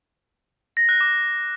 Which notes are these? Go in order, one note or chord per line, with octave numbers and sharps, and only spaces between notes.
A#6
F#6
D6